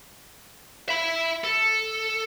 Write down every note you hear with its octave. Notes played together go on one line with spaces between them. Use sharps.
E5 B5
A4